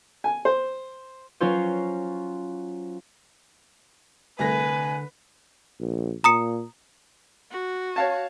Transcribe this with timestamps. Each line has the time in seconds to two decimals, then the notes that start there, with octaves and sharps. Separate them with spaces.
0.24 G#5
0.45 C5
1.40 F#3 C#4 F4 C5
4.39 C2 D3 A3 B4 G#5 A#6
5.80 A#1
6.24 A#2 A#5 D#6 C#7
7.51 F#4
7.96 C#5 F5 A5